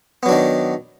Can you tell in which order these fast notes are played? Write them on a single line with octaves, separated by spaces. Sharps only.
B3 F#3 D4 D#3